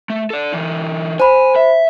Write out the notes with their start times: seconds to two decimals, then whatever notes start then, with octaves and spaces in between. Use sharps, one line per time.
0.10 A3
0.30 A4 D5
0.52 E3 D#4
1.20 C5 G#5 B5
1.56 E5